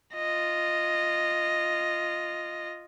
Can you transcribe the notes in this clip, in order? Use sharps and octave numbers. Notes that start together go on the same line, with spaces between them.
F4 D#5